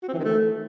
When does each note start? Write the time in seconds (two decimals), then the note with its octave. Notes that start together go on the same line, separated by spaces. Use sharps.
0.03 F#4
0.08 C4
0.13 E3
0.19 D#3
0.24 A3